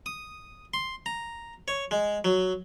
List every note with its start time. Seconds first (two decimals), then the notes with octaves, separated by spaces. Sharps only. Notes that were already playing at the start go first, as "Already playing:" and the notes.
0.06 D#6
0.74 C6
1.06 A#5
1.68 C#5
1.91 G#3
2.25 F#3